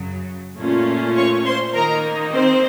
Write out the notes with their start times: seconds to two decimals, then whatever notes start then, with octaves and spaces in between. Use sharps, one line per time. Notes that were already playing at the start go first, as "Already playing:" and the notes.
Already playing: F#2 C#3 F#3
0.58 A#2 A3 C#4 F4
1.16 C#5 C#6
1.46 C5 C6
1.74 D#3 A#3 D#4 A#4 A#5
2.32 C4 C5